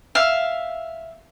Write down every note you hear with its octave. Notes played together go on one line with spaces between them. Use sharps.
E5 F5